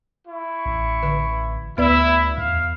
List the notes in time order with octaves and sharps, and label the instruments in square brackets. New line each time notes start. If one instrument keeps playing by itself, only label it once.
[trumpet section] E4 C#6
[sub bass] A1
[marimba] D3 B4
[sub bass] D2 [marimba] B3 B4 D5 [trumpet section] E4
[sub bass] E2 [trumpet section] F5